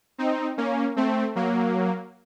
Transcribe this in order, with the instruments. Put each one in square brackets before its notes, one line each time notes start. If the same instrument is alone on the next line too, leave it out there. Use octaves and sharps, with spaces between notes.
[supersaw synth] C4 D#4
A#3 C#4
A3 C4
F#3 A#3